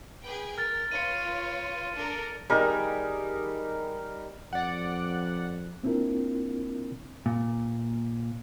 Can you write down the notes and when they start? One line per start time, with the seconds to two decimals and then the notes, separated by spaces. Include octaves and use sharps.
0.24 G#4 B4 G5
0.58 A#4 F6 A6
0.92 F4 B4 C#5 C#7 D#7
1.95 D4 A4 A#4
2.50 D#3 G3 D#4 G#4 A#4
4.53 F2 D5 F#5
5.83 A#3 C4 D4 E4 F4 A#4
7.26 A#2